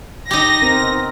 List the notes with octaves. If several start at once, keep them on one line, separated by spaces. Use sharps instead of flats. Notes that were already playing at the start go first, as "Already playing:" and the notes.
D#4 G4 A#6
B3 C4 A#4